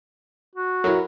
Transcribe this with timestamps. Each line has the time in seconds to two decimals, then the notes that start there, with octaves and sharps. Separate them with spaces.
0.55 F#4
0.84 F#3 E4 A#4